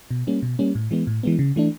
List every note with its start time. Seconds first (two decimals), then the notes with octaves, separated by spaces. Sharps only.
0.11 B2
0.27 G3 A#3 C#4
0.43 B2
0.59 G3 A#3 C#4
0.75 A2
0.91 E3 G#3 B3
1.07 A2
1.23 E3 G#3 B3
1.39 C#3
1.56 E3 A3 D4